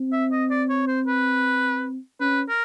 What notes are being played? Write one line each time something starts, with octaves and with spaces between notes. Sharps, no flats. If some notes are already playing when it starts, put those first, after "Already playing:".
Already playing: C4
E5
D#5
D5
C#5
C5
B4
C#4 B4
A#4